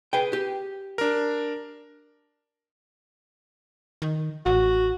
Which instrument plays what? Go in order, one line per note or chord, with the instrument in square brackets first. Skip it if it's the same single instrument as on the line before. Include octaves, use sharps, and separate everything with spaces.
[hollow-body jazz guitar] G#4 B4 G5
G4
[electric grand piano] D4 A#4
[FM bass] D#3
[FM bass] A1 [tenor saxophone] F#4